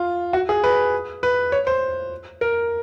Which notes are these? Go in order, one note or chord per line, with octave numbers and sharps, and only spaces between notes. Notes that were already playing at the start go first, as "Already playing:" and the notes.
Already playing: F4
F#4
G#4
B4
B4
C#5
C5
A#4